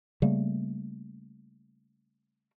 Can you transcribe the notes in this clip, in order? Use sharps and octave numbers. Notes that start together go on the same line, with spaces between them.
C#3 G3 A3 A#3